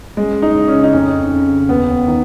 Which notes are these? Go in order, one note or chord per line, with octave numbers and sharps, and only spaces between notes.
F#2 G#3
D#4
C#3
C#4
D#4
F2 C#4
C#3
D#2 B3
D#3